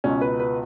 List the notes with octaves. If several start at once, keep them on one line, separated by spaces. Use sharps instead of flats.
C#2 B2 C#4
B4
B4